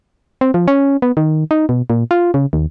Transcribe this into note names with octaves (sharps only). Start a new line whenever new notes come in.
C4
F3
C#4
B3
D#3
D#4
B2
A#2
F4
C#3
D#2